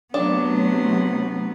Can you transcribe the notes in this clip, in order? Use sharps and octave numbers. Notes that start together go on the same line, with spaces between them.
C3 F#3 A3 B3 D4